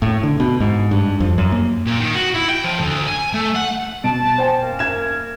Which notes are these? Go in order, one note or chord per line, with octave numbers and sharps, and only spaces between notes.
A2
D3
B2
G#2
G2
F2
F#2
A#3
A#2
D#3
F#4
E4
G5
F3
D2
G#5
A3
F#5
B2 A5 D7
C5 G5 G#5
F#2 A#3 A#4
G#6 E7